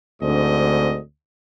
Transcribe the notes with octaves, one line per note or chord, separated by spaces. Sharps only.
D2 G#2 C4 D4 D#5